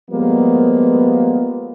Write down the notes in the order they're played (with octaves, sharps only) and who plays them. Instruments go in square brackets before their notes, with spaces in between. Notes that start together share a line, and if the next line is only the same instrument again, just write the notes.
[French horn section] F3 G3 G#3 A#3 B3